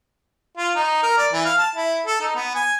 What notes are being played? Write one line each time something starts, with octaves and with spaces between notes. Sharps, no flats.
F4
D#4
A#4
D5
E3
F5
A5
E4
A4
D#4
B3
G#5